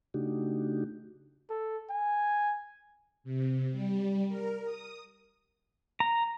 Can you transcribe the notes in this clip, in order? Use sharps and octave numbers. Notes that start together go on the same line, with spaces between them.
C#3 A3 D4 D#4 F#4 G4
A4
G#5
C3
G3
A#4
D#6
A#5